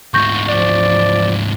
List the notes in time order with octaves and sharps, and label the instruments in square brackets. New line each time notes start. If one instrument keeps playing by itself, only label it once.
[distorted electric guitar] D2 G#2 [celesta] C#6 G6 A#6
[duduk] F3 [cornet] D5